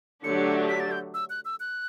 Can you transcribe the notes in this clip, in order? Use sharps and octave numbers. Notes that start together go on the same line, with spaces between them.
D3 F#3 A3 D4 G4 C#7
B6
A6
G6
E6
F#6
E6
F#6